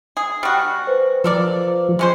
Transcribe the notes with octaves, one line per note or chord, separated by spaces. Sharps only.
G#4
G3 F#4 F6
B4 C5
F3 A4 A#4 D5
G#3 C#4 C5